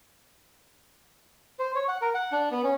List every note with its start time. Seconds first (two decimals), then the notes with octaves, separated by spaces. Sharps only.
1.59 C5
1.75 C#5
1.88 F#5
2.02 A#4
2.14 F#5
2.32 D4
2.51 B3
2.63 C#4